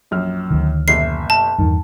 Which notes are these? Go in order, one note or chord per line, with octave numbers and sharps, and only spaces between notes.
A#1 F#2 F6
D2 D#3
F#1 B2 E5 C7
A5
E2 G2 D#3